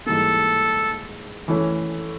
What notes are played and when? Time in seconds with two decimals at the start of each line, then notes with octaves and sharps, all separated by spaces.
0.06 G#2 E3 G3 A#3 A4
1.48 E3 A3 C#4